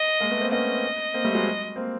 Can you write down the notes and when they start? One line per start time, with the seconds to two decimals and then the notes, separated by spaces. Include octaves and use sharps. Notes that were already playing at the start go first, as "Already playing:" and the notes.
Already playing: D#5
0.20 G#3 A#3
0.31 A3 B3
0.41 A#3 C4
0.52 B3 C#4 D#5
1.14 A#3 C4
1.25 G3 A3
1.35 F#3 G#3
1.76 A#3 C4